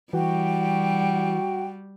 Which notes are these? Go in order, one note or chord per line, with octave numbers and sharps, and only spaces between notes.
E3 G3 F#4 G5